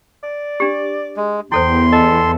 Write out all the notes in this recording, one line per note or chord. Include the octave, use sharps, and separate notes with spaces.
D5
D4 G4
G#3
E2 E4 A4 C5 G5 C6
A4 D#5